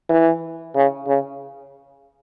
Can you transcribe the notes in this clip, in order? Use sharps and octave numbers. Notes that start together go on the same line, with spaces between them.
E3
C#3
C#3